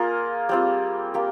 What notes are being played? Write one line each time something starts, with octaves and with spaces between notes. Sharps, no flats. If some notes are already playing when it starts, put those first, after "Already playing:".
Already playing: A#3 F4 G#4 A#4
G3 C4 F4
A#3 G4